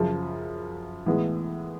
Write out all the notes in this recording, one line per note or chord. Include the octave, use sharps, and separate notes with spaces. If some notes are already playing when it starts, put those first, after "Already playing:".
Already playing: F#2 C#3 F3
A2 E3 G#3 B3